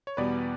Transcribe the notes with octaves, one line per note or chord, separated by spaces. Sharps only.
C#5
E2 B2 G3 B3 B4 D5